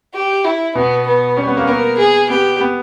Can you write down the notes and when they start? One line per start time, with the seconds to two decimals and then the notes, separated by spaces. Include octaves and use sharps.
0.14 G4
0.45 E4
0.75 B2 B3
1.07 B3
1.37 G3 C#4
1.47 B3
1.57 A#3
1.67 B3 A#4
1.98 G#4
2.30 B3 G4
2.60 B3